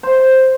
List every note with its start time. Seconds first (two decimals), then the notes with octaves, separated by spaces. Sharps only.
0.03 C5